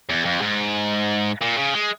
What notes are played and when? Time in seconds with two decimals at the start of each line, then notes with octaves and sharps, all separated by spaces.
0.09 E2
0.25 F2
0.42 G#2
1.42 A#2
1.58 C#3
1.74 G#3